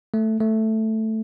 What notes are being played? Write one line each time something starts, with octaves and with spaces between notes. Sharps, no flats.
A3
A3